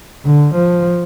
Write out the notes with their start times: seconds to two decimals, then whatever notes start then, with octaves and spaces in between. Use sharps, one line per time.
0.25 D3
0.55 F3